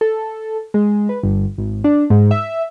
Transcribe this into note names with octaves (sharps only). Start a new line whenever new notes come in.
A4
G#3
B4
G1
G#1
D4
G#2
E5